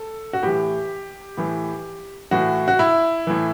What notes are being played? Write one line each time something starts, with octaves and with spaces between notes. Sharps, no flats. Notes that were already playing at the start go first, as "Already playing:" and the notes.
Already playing: A4
F#4
A2 E3 G4
A2 E3
A2 E3 F#4
F#4
E4
A2 E3